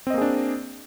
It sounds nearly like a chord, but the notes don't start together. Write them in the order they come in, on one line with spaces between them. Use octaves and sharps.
C4 D#5 A#3 G#4 D4